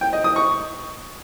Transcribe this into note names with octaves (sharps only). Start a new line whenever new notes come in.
G5
D#5
D#6
C#6